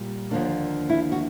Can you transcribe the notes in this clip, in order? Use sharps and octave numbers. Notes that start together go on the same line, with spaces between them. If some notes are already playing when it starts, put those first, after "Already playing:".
Already playing: A#2 G3
D#2 D3 F3 A#3 D4
E4
F#4